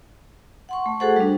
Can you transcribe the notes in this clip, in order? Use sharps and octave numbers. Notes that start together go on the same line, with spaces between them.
F#5 C6 C#6
A3
F#4 G#4 A4 C5 F#5
G3 D4